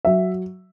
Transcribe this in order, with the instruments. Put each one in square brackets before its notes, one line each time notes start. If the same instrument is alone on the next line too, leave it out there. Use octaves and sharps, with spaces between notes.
[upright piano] F#3 E5